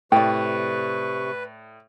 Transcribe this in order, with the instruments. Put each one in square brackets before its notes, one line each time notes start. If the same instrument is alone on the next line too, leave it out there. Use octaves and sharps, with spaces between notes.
[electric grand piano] A2 [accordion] C3 C#6 [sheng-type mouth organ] B4 [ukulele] D5 G5